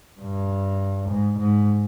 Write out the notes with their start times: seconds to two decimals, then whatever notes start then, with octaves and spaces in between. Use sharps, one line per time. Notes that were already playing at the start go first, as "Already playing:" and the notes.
0.20 G2
1.10 G#2
1.39 G#2